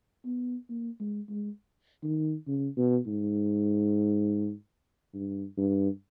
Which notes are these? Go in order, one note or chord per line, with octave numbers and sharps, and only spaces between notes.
B3
A#3
G#3
G#3
D#3
C#3
B2
G#2
G2
G2